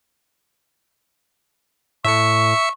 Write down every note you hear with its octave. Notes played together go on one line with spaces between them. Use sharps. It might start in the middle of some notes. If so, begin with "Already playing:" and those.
A2 E5 C#6 C#7